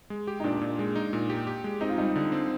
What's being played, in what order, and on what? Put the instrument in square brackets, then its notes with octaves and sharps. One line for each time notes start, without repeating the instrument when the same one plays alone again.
[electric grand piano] G#3
G4
[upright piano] D#4
[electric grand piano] A#2 [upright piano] D4
[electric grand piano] A#2
G#3
D#4
A#2
G4
G4
G#3
[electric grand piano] C4 [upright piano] D#4
[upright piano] F4
[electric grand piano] G3 [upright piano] D#4
[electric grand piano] D3
C4